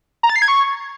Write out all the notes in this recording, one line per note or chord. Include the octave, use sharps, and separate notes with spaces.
A#5
A6
C7
G#6
C#6